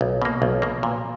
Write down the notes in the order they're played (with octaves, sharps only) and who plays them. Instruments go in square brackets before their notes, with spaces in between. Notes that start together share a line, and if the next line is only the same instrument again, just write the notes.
[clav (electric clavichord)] B1
B2 A#3
B1
B2 A#3
A#2